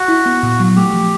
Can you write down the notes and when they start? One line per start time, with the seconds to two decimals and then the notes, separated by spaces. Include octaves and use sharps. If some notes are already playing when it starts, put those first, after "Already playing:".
Already playing: F#4
0.08 E4
0.26 B3
0.43 A#2
0.60 F#3
0.76 A3 G4
0.94 F3